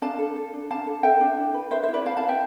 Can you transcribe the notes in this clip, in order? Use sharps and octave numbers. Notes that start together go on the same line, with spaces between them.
D4 F5 A5
A4
A4
D4
D4 F5 A5
A4
A4 E5 G5
D4
E4
B4
B4 C5 E5
C5 E5
E4
B4 D5
E4 F5 A5
F5 A5
B4
E5 G5